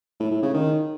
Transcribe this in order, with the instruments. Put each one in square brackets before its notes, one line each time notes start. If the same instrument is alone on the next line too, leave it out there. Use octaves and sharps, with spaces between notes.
[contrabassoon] A2
A2
C#3
D#3